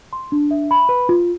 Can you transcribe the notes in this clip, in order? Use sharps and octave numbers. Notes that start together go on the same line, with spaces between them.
C6
D4
E5
B5
B4
F4